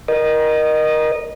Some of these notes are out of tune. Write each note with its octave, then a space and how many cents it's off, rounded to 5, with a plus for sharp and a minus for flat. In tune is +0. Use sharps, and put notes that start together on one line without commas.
A#4 +20 D#5 -20